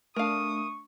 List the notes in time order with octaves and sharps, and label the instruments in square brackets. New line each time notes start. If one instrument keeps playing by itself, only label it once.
[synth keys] A3 D4 [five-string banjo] A#4 F5 [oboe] C#6 [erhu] D#6